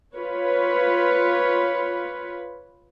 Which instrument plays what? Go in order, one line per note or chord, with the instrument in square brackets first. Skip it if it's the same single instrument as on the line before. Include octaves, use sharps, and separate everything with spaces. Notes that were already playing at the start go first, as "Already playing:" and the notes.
[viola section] F4 B4 C#5